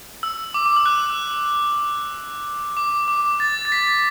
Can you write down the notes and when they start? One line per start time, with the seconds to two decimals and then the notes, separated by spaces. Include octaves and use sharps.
0.23 E6
0.54 D6
0.66 D6
0.76 E6
0.86 F#6
2.77 D6
3.08 D6
3.40 A6
3.65 A6
3.72 B6